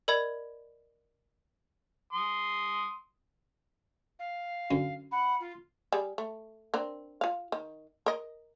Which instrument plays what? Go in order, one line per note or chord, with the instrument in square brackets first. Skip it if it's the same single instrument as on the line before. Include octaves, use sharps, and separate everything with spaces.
[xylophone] A#4 D5 D#5 B5 G#6
[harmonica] C6 D#6
[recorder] F5
[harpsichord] F#2 D3
[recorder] F#5 [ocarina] B5
[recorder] F4
[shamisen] G3 G#4
A3
C4 D4 A#4
F4 F5
D#3
A#4 D#5